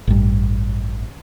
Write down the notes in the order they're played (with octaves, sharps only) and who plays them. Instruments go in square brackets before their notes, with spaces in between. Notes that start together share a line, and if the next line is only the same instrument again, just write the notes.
[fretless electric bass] A1 G2